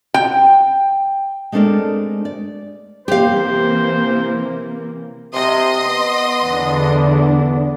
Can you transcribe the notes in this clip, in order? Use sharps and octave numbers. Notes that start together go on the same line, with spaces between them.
G5
G#3 A3 C4 D4 A#4 D5
D5
C3 E3 A#3 G4 C5 F5
C3 D#5 C6 D#6
B3
E2 D3 D4